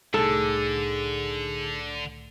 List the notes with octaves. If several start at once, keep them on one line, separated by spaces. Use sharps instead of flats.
C2 A2 D3 D#4 G#4 A4